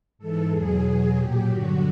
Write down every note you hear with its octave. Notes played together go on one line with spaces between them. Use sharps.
G#2 E3 A4
E2 B2 F#3 G#4
E2 B2 F#3
A#2 F#3 G4
G2 D3 F#3 F#4